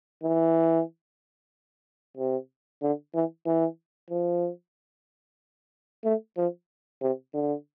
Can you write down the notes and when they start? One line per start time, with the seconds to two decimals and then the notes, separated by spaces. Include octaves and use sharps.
0.23 E3
2.17 C3
2.82 D3
3.14 E3
3.46 E3
4.10 F3
6.05 A3
6.37 F3
7.02 C3
7.34 D3